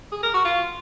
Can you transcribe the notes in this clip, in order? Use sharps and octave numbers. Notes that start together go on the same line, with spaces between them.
G#4
A#4
F#4
F4